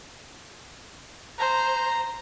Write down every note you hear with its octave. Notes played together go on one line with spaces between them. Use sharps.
C5 A#5